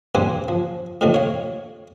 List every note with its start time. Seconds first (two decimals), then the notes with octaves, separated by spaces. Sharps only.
0.15 G2 A#3 G4 B4 C5 G#5
0.48 F3
1.01 F2 A2 C3 D#3 A#3
1.14 C#5 F5